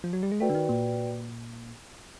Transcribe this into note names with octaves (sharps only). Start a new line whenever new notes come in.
F3
F#3
G3
G#3
A3 F#4 B4 D5 G5
D3
D#3
A#2